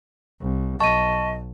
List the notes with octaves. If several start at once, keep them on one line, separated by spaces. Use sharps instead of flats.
C2
B1 D#5 A5 C#6 D#7